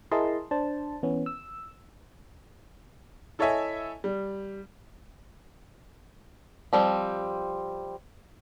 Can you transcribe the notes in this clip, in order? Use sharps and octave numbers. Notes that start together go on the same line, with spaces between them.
E4 G#4 A#4 D#5 A5 C6
D4 C5 A5
E3 B3 C#4
E6
E4 A4 C#5 D#5 E5 G#5
G3
F3 G3 C4